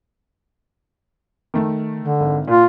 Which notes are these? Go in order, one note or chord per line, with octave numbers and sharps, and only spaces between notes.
D#3 A3
D3
G#1
A#2 F4